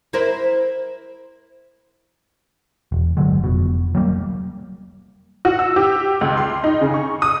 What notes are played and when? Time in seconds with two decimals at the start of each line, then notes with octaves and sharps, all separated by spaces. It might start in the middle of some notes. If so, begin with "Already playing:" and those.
0.13 E4 A#4 C5
2.92 E1
3.17 G1 D3 F#3 G#3
3.44 F1 B2
3.95 F#3 G3 A#3
5.45 F#4
5.59 E6
5.76 G4
6.21 C#2
6.37 C6
6.64 D#4
6.81 C#3
6.94 C#6
7.22 D#6